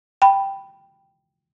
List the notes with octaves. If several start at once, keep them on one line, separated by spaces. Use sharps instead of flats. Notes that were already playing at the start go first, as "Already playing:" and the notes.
G5 B5